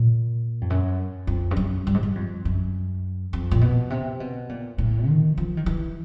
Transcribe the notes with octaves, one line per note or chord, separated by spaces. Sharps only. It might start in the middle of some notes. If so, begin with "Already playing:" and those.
Already playing: A#2
F2
F#2
F2
G2
F#2
G2
G#2
G2
F2
F#2
F2
A#2
B2
C3
B2
A#2
A2
D#3
F3
D#3
E3